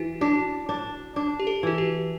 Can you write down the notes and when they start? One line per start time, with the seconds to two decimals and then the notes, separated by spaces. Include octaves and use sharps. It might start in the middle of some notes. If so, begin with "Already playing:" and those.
Already playing: E3 E4 F#4
0.21 D4 F#4
0.69 D4
1.16 D4
1.40 G4
1.47 A4
1.63 E3 F#4
1.78 G4